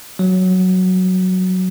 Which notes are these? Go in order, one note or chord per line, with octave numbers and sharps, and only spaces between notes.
F#3